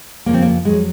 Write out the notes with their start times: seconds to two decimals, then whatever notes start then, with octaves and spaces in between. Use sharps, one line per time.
0.26 F2 C#3 F3 A#3
0.34 C4
0.42 A#3
0.65 F2 D#3 F#3 G#3